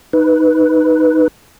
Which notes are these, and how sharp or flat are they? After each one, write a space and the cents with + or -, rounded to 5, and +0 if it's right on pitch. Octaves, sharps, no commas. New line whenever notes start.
D#4 +0 B4 +0